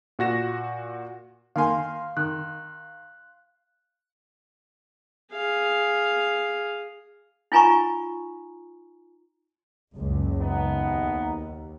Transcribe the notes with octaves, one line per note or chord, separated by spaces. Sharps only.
A#2 F#4 A#6 E7
D#3 A#3 F5 G#5 C6
D#3 F#6
G#4 F5
D#4 F4 G#5 A#5 B5 C#6
F#1 C#2
G#1 B3 D#4
D#2